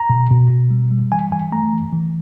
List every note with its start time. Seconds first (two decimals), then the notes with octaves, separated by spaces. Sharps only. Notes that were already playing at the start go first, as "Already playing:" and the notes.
Already playing: A#5
0.10 B2
0.30 B2
0.50 B2
0.71 G3
0.91 G3
1.12 E3 G#5
1.32 E3 G#5
1.52 A3 A#5
1.73 E3
1.93 E3